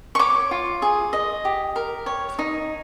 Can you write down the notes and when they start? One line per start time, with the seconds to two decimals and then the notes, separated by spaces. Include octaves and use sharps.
0.15 C#6
0.19 C#5 D6
0.51 F4
0.82 G#4
1.13 D#5
1.45 G4
1.76 A#4
2.06 C#5
2.39 D#4